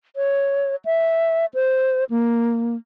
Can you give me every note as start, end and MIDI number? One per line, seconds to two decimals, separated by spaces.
0.16 0.76 73
0.85 1.46 76
1.54 2.04 72
2.10 2.76 58